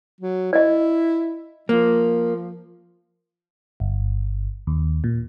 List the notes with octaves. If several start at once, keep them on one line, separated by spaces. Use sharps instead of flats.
F#3
E4 D5 D#5
F3 A#3
G1
D#2
A#2